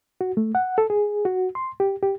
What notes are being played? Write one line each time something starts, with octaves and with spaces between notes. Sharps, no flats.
F#4
A3
F#5
A4
G#4
F#4
C6
G4
G4